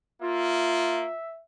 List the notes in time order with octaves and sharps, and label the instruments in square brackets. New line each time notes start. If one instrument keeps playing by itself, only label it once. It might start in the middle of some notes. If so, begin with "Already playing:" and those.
[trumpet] A#3 [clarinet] F4 [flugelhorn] E5